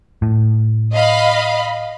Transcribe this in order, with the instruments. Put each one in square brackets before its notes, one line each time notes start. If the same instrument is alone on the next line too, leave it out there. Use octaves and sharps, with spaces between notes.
[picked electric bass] A2
[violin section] D#5 F5 B5